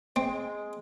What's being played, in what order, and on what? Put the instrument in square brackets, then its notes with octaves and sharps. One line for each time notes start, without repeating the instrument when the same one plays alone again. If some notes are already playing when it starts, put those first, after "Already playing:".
[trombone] G#3 [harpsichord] C4